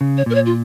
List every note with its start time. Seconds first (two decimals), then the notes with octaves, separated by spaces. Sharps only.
0.01 C#3
0.17 C#5
0.26 A#2 A#4
0.34 C#5
0.45 F4